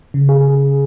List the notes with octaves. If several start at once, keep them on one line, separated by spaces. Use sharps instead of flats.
C#3
G#4